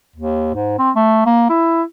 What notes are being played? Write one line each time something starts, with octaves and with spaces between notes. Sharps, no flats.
D#2
G#2
C4
A3
A#3
E4